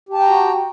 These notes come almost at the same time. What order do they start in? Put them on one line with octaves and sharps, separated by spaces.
G4 A5 G5 A#5 F#4